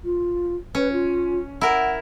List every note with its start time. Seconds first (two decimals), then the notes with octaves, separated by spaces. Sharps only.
0.04 F4
0.75 C#4 B4
0.92 F4
1.61 E4 A#4 F#5